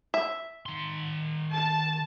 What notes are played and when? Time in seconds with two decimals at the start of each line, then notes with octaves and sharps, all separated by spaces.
0.14 E5
0.66 D#3 C6
1.53 A5